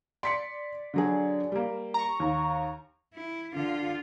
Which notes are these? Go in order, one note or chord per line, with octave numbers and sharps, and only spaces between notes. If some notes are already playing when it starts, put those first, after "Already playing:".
D5 C6 B6 C#7
D3 F#3 G#4
G3 A#3
A#5 C#6
D#2
E4
D3 F4